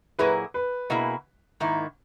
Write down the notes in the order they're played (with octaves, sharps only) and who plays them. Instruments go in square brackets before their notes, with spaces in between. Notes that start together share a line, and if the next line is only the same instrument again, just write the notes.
[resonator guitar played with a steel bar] A#2 F#3 A#3 E4 G#4 [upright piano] B4
[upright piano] B4
[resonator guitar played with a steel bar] B2 A#3 E4 G#4
G#2 D#3 A#3 E4